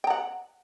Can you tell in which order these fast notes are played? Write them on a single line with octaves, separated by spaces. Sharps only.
G5 A#5 F#5